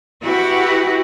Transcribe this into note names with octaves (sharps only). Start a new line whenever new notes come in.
E4 F#4 G4 B4 F#5